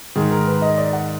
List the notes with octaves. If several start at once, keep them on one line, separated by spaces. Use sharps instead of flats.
G#2 D#3 G#4
A#4
B4
D#5
D5
F#5